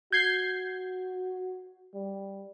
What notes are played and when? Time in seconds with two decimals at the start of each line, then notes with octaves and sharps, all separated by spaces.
0.12 F#4 G6 G#6 C7
1.94 G3